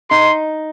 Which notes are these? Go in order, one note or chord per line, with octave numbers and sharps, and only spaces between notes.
D#4 C6